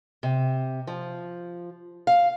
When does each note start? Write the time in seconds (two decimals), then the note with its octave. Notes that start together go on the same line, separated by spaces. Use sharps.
0.23 C3
0.87 F3
2.07 F5